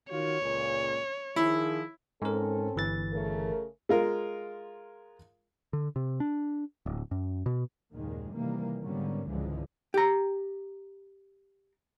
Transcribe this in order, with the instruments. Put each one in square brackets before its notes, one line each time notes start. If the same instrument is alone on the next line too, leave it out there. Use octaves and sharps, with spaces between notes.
[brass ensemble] D#3 F4 F#4 [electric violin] C#5
[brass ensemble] C#2 A#2
[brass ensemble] D#3 F3 G#4 [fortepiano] E4
[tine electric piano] G#2 A#4 [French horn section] C4 C#4 A4
[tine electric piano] G1 E3 A6
[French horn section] C#3 A3 A#4
[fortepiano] G#3 F4 A#4
[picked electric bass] D3
C3
D4
D1
F#2
B2
[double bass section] F#1 D#2 A#2 D#3 G#3
C3 D#3 E3 G3 A#3
G#2 D3 G3 A#3 B3 C#4
C#2 G#2 D3 E3 F3 G#3
[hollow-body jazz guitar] G4 A#5